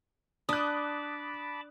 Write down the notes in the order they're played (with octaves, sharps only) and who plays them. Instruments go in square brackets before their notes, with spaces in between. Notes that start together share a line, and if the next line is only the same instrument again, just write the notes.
[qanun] D4 [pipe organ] A5 B5 D6 [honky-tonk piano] D#6 F#6